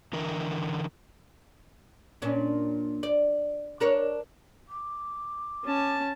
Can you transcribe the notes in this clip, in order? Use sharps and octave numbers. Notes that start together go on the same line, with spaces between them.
D3 E3 A#4
A#2 C#4 D4
D5
D4 A#4 C#5
D6
C#4 A5